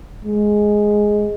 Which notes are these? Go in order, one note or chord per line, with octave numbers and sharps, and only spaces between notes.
G#3